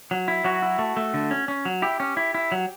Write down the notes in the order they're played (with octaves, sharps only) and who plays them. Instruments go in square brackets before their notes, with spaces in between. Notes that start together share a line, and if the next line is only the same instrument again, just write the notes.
[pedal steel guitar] F#3
E4
F#3 F#4
E4
A3
A3
D3
C#4
C#4
F#3
E4 G4
C#4
E4
E4
F#3